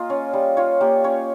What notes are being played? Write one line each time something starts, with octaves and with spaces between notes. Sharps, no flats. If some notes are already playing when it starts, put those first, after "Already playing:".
Already playing: A#3 F4 G#4 D#5
C#4
G3
F4 C#5
A#3 G4
C#4 C#5